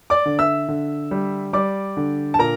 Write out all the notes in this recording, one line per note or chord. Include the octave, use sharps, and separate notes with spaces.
D5 D6
D3
E5 E6
D3
G3
G3 D5 D6
D3
A5
A#2 A#4 A#5